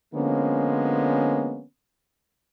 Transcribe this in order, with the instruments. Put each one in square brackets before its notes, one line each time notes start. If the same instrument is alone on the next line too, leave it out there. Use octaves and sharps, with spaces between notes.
[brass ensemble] D3 F3 G#3 A#3 B3 C#4